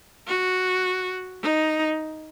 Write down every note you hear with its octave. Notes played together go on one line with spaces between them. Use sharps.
F#4
D#4